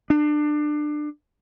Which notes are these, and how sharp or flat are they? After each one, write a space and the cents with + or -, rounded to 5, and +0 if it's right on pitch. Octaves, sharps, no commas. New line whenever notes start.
D4 +25